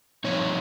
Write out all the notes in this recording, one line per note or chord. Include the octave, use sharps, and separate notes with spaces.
G2 F3 C4 D#4 C#5